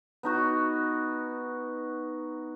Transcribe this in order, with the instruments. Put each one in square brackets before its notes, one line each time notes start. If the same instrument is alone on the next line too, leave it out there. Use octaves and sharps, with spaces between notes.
[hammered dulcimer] B3 D#4 F#4